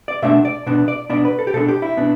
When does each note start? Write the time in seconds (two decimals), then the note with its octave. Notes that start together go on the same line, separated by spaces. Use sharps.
0.08 D5
0.22 B2 A3 D4 E5
0.45 D5
0.66 B2 B3 D4
0.88 D5
1.09 B2 B3 D4 D5
1.25 B4
1.39 A4
1.47 G4
1.53 B2 B3 D4 A4
1.68 G4
1.82 E4
1.97 B2 B3 D4